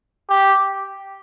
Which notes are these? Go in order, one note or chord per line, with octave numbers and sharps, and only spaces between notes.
G4